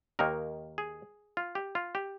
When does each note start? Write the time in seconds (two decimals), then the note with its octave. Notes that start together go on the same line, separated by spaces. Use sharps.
0.19 D#2 D#3 A#3 D#4 A#4
0.78 G#4
1.37 F4
1.55 G4
1.75 F4
1.95 G4